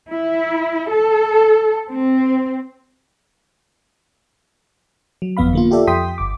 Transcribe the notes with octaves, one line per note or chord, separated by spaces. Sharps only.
E4
A4
C4
F#3
G1 F2 B3 F5 B5
D3 A#3 F4
F4 G4 A4 D5 E5
F2 G5 C6 D#6 B6
G1 D6